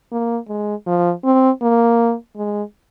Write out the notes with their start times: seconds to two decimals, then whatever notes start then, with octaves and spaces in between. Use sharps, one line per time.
0.12 A#3
0.49 G#3
0.86 F3
1.24 C4
1.62 A#3
2.36 G#3